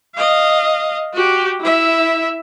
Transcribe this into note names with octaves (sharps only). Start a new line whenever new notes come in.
D#5 F5
F#4 G4
E4 E5